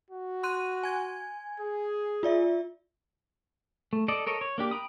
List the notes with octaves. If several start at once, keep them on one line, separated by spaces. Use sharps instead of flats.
F#4
C6 F#6 D#7
G#5 G#6
G#4
F4 D5 E5
A3
A4 D5 D#5
A4 A#4 C#5 D#5
C#5
A#3 D4 G4
G5 A#5 B5 D#6